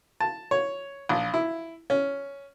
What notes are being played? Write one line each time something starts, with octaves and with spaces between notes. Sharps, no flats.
A5
C#5
A#1
E4
C#4